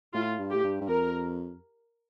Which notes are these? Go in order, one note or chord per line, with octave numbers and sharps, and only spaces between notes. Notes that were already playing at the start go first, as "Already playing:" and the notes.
A2 F4
G2
A2 G4
G2
G2
F2 A#4